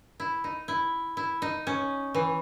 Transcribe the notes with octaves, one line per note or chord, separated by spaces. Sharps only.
E4
D#4
E4
E4
D#4
C#4
E3